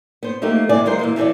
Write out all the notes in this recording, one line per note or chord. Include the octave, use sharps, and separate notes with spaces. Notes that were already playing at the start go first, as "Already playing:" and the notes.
B3 C5
F3 A3 A#3 D#4 G4
D#2 E3 G#3 D5 G#5
D2 F#3 G#3 F4 A#4 C5
A#2 E3 A#3
E3 F3 G4 C#5 D5